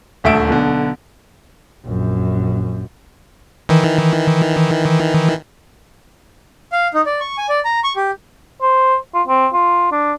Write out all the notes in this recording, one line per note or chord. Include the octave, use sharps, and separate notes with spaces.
D#1 D2 A3 E5 D7
B1 B2 D3
A#1 F#2
D#3 E3
F5
D#4
D5
C#6
G#5
D5
A#5
C#6
G4
C5
F4
C4
F4
D4